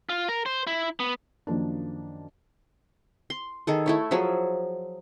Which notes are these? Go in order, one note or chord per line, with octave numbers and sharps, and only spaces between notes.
F4
A#4
C5
E4
B3
F#2 D#3 F3 A#3 D4
C6
D#3 G#4 A4
A3 E4 C#5
F3 F#3 G#4 E5